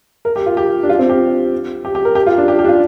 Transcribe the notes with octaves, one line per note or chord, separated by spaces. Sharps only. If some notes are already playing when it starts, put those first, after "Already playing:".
A#4
G4
F4
G4
D4
F4
C4
G4
G4
G4
A#4
G4
F4
D4
G4
G4
D4
F4